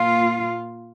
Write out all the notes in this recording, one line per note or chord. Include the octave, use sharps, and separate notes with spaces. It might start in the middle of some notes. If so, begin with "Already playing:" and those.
Already playing: A#2 A#3 F4